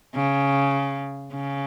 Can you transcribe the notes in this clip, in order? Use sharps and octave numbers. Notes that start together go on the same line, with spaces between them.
C#3
C#3